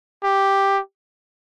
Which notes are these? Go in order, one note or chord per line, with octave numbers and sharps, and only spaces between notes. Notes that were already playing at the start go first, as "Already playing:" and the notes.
G4